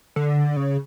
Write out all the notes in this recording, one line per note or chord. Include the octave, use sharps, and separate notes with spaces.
D3
C#3